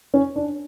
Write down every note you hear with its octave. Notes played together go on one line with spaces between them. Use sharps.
C#4
D4